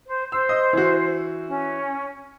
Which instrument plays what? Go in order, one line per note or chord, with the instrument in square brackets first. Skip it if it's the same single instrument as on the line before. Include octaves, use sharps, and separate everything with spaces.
[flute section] C5
[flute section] C5 [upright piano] E6
[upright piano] D#5
E3 F#4
[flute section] C#4